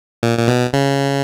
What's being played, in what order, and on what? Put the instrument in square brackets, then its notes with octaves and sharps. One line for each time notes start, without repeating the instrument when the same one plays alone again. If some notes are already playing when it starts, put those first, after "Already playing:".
[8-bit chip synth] A#2
A#2
B2
C#3